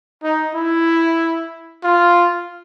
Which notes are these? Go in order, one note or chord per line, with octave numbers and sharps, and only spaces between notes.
D#4
E4
F4